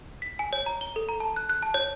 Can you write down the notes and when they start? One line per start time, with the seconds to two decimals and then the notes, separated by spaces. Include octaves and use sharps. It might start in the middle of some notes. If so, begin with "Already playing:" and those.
0.22 B6
0.39 G#5
0.53 C#5
0.66 A#5
0.81 G7
0.96 A4
1.09 A#5
1.20 A5
1.36 F#6
1.49 F#6
1.62 A5
1.74 C#5